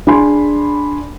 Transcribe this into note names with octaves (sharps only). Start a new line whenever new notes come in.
D4 G#4 G#5 B5 C6